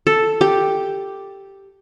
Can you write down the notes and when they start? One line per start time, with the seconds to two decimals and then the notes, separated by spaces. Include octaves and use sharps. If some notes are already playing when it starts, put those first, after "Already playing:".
0.07 A4
0.41 G4